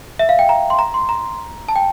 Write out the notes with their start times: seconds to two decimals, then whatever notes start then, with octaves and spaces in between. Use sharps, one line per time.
0.19 E5
0.29 F5
0.39 G5
0.49 A#5
0.70 C6
0.79 A#5
0.94 C6
1.09 A#5
1.69 A5
1.76 G5